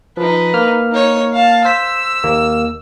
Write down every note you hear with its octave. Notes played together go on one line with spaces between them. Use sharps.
F3 D#4 B4
A#3 F6
D#4 C#5
F5 A5
C5 E6 B6
D#2 A#3